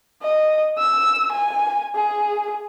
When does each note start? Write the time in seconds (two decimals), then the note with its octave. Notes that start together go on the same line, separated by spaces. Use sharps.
0.23 D#5
0.78 E6
1.32 G#5
1.95 G#4